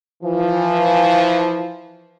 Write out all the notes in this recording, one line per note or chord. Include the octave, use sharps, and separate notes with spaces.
E3 F3